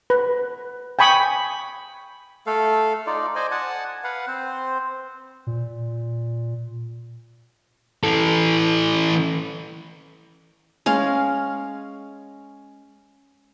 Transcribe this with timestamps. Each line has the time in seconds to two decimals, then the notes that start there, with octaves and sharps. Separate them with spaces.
0.10 B4
0.99 G5 G#5 B5 C#6 D#6
2.46 A3 A4 F5
3.07 D#4 F4 D5
3.35 C5 D5 D#5 G#5
3.51 F#5 G#5 A5
4.04 B4 F5 F#5
4.27 C4 C5
5.47 A#2
8.03 E3 A4
10.86 G#3 C#4 F5